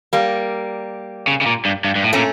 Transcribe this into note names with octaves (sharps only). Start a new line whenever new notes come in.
G3 A#3
C#3
C#3
A#2
G2
G2
G2
A2
A#2 A3 C#4